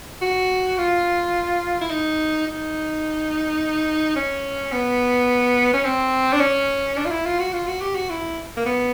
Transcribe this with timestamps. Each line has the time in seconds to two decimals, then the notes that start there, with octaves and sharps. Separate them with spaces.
0.22 F#4
0.78 F4
1.81 E4
1.90 D#4
2.47 D#4
4.16 C#4
4.72 B3
5.73 C#4
5.85 C4
6.33 D4
6.41 C#4
6.97 D4
7.05 F4
7.11 E4
7.26 F4
7.39 F#4
7.53 F4
7.67 F#4
7.81 G4
7.95 F#4
8.10 E4
8.57 A#3
8.66 B3